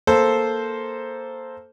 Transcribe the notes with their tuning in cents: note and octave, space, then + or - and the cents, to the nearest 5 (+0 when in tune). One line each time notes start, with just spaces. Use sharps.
A#3 +0 A4 -5 C5 +0